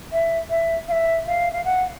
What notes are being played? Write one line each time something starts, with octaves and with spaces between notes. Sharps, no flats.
E5
E5
F5
E5
F5
F5
F#5